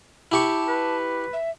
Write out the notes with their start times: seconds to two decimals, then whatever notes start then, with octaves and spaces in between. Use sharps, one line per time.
0.32 E4 G4 A5 C#6
0.68 B4
1.33 E5